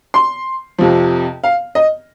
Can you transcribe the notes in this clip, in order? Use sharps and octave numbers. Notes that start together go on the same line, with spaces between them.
C6
F2 C3 F3
F5
D#5